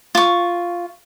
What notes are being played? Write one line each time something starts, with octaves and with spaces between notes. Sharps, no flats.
F4 C#6